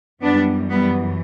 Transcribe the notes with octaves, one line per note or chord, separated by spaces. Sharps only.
F#2 E3 G3 B3 D4
G3 B3